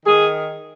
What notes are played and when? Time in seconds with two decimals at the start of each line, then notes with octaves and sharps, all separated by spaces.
0.05 D#3 G#4